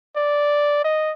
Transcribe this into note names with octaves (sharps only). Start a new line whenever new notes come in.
D5
D#5